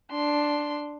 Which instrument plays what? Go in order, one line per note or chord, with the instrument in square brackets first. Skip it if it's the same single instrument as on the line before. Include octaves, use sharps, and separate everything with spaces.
[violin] D4 C6